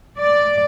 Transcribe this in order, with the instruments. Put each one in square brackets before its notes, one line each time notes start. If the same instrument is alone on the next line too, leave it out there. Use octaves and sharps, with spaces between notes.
[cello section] D5